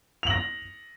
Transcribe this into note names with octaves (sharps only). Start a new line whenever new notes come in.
A#6 F7 F#7